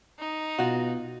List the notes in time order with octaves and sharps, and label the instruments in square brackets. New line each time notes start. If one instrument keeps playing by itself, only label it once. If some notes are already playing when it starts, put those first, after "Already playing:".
[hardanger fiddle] D#4
[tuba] B2 [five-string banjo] F4 F#4